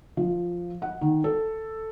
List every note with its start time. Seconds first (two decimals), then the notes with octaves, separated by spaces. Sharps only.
0.17 F3
0.82 F#5
1.01 D#3
1.24 A4